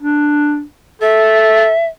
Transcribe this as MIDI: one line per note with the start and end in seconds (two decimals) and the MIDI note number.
0.01 0.63 62
1.02 1.71 69
1.02 1.86 76